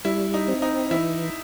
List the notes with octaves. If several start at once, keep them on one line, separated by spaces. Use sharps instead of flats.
G3 E4
D#4
C4
D#4
E3 E4